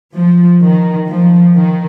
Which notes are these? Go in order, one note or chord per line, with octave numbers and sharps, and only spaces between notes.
F3
D#3
F3
D#3